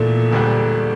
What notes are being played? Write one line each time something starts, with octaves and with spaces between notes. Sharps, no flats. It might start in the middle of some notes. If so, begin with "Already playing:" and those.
Already playing: E2 A#2 D3 A3
E1 D2 D3 G3